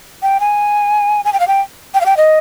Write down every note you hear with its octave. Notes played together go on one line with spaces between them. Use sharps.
G5
G#5
G#5
G5
F5
G5
G5
F5
G5
D#5